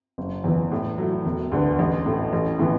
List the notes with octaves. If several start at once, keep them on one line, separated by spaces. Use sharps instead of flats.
F#1
E2 E3
A2
F#3 A3 E4
E1
D2 D3 B3
A1
A2 A3
A1
A2 E3 B3